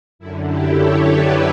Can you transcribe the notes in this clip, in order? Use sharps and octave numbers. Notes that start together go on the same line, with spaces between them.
F#2 D3 E4
E4 G4
A4 C#5
B4 D5